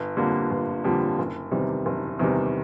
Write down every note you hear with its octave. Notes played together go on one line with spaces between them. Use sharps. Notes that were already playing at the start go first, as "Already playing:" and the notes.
Already playing: G1
F2 D3 G3 A#3
G1
F2 D3 G3 A#3
F#1
E2 C3 D#3 G3
F#1
E2 C3 D#3 G3